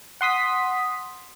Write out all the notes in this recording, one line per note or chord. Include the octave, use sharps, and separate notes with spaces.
F#5 C6 D#6 B6